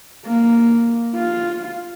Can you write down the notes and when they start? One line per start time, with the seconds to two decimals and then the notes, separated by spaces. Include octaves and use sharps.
0.25 A#3
1.15 F4